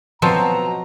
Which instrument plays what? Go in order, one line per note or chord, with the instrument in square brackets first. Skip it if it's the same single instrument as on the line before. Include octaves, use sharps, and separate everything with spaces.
[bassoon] B2 [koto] F3 F#3 C4 [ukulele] A5 [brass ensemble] A#5